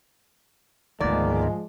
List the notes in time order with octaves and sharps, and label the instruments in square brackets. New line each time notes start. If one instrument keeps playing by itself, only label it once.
[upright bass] D2 G#2 [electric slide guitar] D#3 A#3 B3 [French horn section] F3 G#3 [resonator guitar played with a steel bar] D5